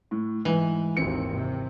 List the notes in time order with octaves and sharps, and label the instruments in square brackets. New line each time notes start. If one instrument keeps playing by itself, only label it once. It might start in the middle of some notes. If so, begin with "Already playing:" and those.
[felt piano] A2
[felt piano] G#2 [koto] E3
[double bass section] G#1 D#2 G#2 [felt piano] C4 C#7
[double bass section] C3